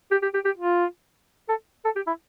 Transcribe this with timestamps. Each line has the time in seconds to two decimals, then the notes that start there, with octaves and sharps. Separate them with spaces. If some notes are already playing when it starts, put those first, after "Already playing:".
0.11 G4
0.23 G4
0.34 G4
0.45 G4
0.57 F4
1.49 A4
1.85 A4
1.96 G4
2.07 E4